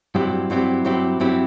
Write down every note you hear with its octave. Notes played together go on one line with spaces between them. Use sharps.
G2 F#3 C4 E4 G4
G2 F#3 C4 E4 G4
G2 F#3 C4 E4 G4
G2 F#3 C4 E4 G4